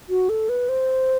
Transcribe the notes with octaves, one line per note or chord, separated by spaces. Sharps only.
F#4
A4
B4
C5